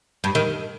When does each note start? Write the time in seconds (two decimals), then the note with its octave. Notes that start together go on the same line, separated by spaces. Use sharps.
0.24 G2
0.35 D#3